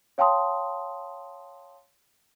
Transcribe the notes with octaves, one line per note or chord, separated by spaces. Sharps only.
C#5 F5 G5 A5 C6 D#6